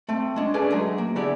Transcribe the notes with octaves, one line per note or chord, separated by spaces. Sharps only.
A3 C4
G#3 C#4 D4
C#4 D4 G#4 A4 B4 D5
F#3 G#3 A3 G#4
A#3
D3 B3 E4 G4 G#4 D5